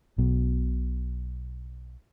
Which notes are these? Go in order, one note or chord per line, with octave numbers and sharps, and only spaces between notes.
B1 B2